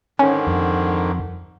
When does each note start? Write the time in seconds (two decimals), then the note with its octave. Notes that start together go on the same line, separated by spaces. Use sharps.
0.19 G#2 D3 D#3 C#4
0.47 F2